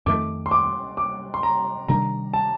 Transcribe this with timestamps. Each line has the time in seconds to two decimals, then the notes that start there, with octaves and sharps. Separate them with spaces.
0.06 F2 D#3 A3 D6
0.46 C6
0.51 D6
0.97 D6
1.34 C6
1.43 A#5
1.88 C3 D#3 G3 D4 A#5
2.33 A5